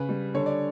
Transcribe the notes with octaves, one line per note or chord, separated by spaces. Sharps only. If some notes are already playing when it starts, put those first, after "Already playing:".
Already playing: C#3 B4
G3
D3 C#5
D5